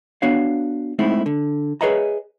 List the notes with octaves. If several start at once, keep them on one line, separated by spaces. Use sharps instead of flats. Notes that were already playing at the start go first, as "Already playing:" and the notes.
B3 D4 F#4 C#5 F5
G#3 A3 C4 D#4 E4
D3
G#4 B4 C#5 D#5 E5 A#5